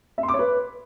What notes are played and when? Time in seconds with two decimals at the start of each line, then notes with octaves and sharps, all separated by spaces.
0.18 E5
0.23 C6
0.28 D6
0.34 C#5
0.39 B4